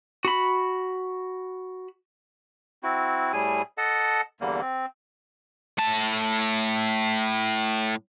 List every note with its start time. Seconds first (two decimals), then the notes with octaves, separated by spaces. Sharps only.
0.25 F#4 B5
2.83 C4 E4 F#4
3.33 A2 G3 G#4 G#5
3.78 A4 D#5 F#5 A5
4.41 E2 D3 G3 A#3
4.61 C4
5.78 A2 A5